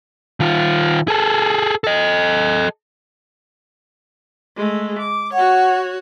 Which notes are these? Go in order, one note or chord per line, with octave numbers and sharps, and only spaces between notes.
D#3 F4
G#4 A4
A4 D#5
G#3 A3
D6
F#4 C#5 F#5